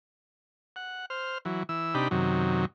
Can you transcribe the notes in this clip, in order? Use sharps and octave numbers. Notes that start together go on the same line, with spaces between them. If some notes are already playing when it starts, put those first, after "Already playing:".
F#5
C5 F6
E3 F#3
E3 E6
C3 D4 D#4 G4 B5
F#2 C3 D#3 F#3